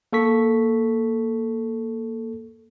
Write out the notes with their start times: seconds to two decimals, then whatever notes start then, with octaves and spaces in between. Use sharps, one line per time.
0.13 A#3 A4 C#6 B6